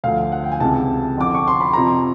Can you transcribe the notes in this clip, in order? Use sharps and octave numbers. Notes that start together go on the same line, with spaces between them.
D2 D3 F3 F5
F#5
G5
G#5
C#2 C3 E3 A5
F2 D3 F3 D6
C#6
C6
B5
F2 C3 F3 A#5